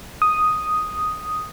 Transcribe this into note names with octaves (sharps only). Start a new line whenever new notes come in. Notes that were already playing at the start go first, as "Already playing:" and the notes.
D#6